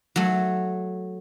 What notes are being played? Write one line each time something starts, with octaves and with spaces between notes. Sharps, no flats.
F#3 A3